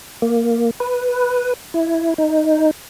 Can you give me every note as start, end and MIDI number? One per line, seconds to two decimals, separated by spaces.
0.22 0.71 58
0.80 1.54 71
1.74 2.14 64
2.18 2.71 63